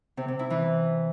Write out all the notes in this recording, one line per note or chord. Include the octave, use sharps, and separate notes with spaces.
C3
C3
E4
E3